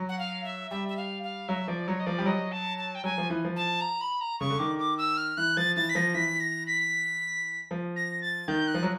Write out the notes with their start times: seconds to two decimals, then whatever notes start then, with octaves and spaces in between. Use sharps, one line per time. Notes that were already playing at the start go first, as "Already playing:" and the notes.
Already playing: F#3
0.09 F#5
0.19 F5
0.44 E5
0.71 G3 E5
0.89 E5
0.97 F5
1.23 F5
1.48 F#3 E5
1.68 F3 D5
1.88 F#3 C#5
2.00 D#5
2.06 F3 D5
2.19 G3
2.26 F#3 D#5
2.52 A5
2.78 A5
2.95 G5
3.04 F#3 G#5
3.18 F3
3.30 E3
3.45 F3
3.56 A5
3.81 A#5
4.01 B5
4.21 A#5
4.40 C#3 C#6
4.50 D3
4.59 D#3 D6
4.79 D6
4.98 E6
5.17 F6
5.37 E3 F#6
5.57 F3 A6
5.76 E3 A6
5.89 B6
5.95 F3 A#6
6.14 E3 B6
6.40 A#6
6.67 B6
7.71 F3
7.96 A#6
8.22 A6
8.48 D#3 G6
8.67 F#6
8.74 F3
8.83 F#3